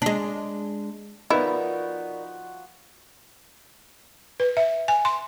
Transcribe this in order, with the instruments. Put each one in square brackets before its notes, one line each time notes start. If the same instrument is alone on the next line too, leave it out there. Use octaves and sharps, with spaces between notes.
[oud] G#3 D4
[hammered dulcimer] F3 F#4 [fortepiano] B3 D#4 [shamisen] E4 [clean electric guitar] A#4 D5
[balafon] B4
E5
G#5
C6